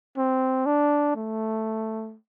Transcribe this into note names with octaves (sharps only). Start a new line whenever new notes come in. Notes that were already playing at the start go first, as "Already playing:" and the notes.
C4
D4
A3